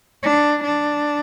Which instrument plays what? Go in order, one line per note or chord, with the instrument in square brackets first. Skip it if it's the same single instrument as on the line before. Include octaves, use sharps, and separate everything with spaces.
[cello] D4
D4